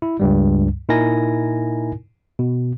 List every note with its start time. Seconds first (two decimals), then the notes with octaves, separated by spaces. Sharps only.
0.02 E4
0.20 C#2 G2 G3
0.89 A#2 D#4 E4 A#4 G#5 A#6
2.39 B2